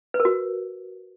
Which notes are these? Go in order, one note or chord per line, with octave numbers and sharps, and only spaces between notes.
B4
A#4
F#4